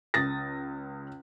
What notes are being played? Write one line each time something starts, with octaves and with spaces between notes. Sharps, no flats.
C#2 D#6 A6 A#6